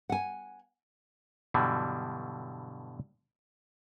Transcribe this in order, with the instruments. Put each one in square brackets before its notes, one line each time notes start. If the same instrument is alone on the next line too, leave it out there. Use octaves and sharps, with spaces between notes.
[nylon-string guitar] F#5 G#5
[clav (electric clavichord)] G2 B2 D3 E3 F#3 G3